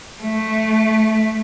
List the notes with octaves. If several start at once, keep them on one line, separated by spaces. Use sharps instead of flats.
A3